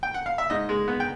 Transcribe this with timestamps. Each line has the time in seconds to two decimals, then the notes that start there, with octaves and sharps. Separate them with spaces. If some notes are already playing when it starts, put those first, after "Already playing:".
0.03 G5
0.14 F#5
0.26 F5
0.38 E5
0.50 G#2 D#5
0.69 G#3
0.88 B3
1.00 G5